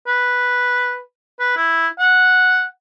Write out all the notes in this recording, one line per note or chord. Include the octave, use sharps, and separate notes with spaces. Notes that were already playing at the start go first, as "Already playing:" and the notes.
B4
B4
E4
F#5